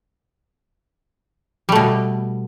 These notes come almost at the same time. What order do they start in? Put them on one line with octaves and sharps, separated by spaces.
G3 A3 B2